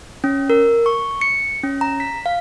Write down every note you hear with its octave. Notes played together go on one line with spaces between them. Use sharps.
C#4
A#4
C#6
C#7
C#4
A#5
B6
F5